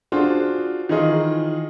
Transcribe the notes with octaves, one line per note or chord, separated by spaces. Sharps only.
D4 F4 F#4 G#4 C5
D#3 E3 D#4 F4 G#4 D#5